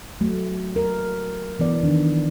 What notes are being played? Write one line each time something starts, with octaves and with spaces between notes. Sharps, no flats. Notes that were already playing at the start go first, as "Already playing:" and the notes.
F#3 A3
A#4
E3 B3 D5
D#3 D4